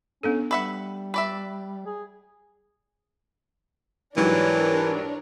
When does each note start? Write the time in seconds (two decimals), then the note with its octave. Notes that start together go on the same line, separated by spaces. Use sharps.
0.23 B3 C#4 D4 A4
0.51 G3 B4 E5 F#5
1.14 B4 D5 E5
1.86 G#4
4.17 G#2 E3 F#3 G3 D4 A#4 C#5